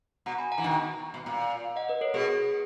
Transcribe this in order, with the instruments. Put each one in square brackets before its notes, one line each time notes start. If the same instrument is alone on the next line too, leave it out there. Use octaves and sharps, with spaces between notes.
[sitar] B2 [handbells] F#5 A#5
[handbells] G#5 B5
F#5 A#5
[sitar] E3
B2 D#3
B2
A#2
[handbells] D#5 F#5
B4 D#5
A#4 C#5
[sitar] B2 [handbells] G#4 B4